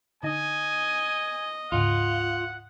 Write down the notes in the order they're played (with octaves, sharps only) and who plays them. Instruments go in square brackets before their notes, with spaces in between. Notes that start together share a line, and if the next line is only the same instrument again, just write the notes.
[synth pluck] D3 D#4 [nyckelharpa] D#5 [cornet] G#5
[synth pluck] D2 G#2 C#3 [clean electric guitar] F4 [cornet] F#5